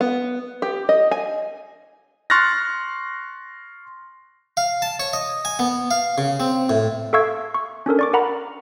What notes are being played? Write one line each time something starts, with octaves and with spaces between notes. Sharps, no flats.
B3
G4
D#5
G#5
C6 C#6 F6 F#6 A6 A#6
F5
A5
C#5
D#5
G#5
B3
F5
C#3
C4
A2
A4 E5 F5 C#6 E6 G#6
C#6
C#4 D4 A4 A#4
D5 C#6 D6
A#4 F#5 A#5 B5